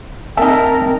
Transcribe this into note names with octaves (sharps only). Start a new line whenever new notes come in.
C4 D#4 A#4 E5 A5